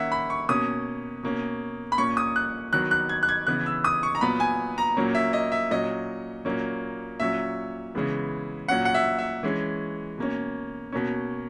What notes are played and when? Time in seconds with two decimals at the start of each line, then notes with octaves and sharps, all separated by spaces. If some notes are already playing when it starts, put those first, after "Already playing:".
Already playing: D#3 A#3 C#4 E5 F#5
0.12 B5
0.30 C#6
0.49 B2 A#3 C#4 D#6
1.23 B2 A#3 C#4
1.92 B5
1.98 A#2 A#3 C#4 C#6
2.17 D#6
2.36 F#6
2.73 D#3 F#3 B3 F#6
2.91 F#6
3.09 G#6
3.23 F#6
3.29 G#6
3.47 C#3 E3 B3 F#6
3.66 E6
3.84 D#6
4.03 C#6
4.15 A#5
4.21 A#2 F#3 B3 B5
4.40 G#5
4.78 A#5
4.97 A#2 F#3 A#3 C#4
5.15 E5
5.33 D#5
5.52 E5
5.71 A#2 F#3 C#4 D#5
6.45 A#2 F#3 A#3 C#4
7.20 A#2 F#3 C#4 E5
7.95 C#3 E3 G#3 B3
8.68 A#2 F#3 C#4 F#5
8.85 F#5
8.94 E5
9.19 E5
9.43 E3 G#3 C#4
10.18 B2 A#3 C#4
10.92 B2 A#3 C#4